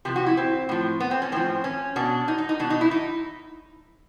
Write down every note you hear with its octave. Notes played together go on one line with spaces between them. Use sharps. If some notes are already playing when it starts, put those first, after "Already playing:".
C3 F3 G4
F#4
E4
C4
A2 F3
B3
C4
C#4
A2 F3 C4
C#4
B2 D4
D#4
D#4
D#4
B2 D4
D#4
E4
D#4